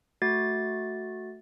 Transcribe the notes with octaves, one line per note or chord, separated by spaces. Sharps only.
A3 F#4 A6